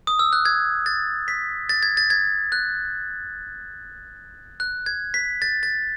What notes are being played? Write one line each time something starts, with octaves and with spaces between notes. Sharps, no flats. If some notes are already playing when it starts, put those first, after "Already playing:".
D#6
E6
F#6
G#6
A6
B6
A6
G#6
A6
G#6
F#6
F#6
G#6
B6
A6
A6